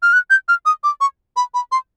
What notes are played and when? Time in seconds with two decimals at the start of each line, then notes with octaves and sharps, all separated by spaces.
0.03 F6
0.13 F#6
0.30 G6
0.48 F6
0.66 D#6
0.84 D6
1.01 C#6
1.36 B5
1.54 B5
1.72 C6